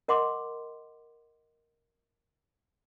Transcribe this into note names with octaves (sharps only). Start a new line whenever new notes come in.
A#4 D#5 F#5 C6 D6